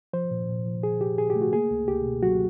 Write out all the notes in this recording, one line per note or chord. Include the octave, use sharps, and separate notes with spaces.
F3 C5
A#2
A#2
F3
A#2 G#4
A#2 G4
A#2 G#4
G4
A3
F#4
A#3 G#4
C#2
C#2 G4
B2
F#3 F#4